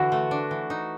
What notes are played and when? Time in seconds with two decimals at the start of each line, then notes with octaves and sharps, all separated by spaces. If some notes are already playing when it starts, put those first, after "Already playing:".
Already playing: D3 E3 F#4
0.12 A3
0.31 D4
0.51 E3
0.70 D#4